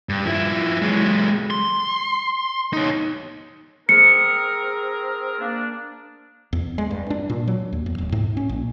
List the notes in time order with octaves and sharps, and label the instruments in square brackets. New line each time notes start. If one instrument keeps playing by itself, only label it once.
[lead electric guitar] G2
F3 E4
F#3 G#3
C6
D#4 C#5
[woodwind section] C4 G#4 A#4 [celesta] C#7
[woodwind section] A#3 D4
[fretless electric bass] E2
G#3
G2
D4
A#2
F#3
D#2
E2
D1
G#2
C#4
A#1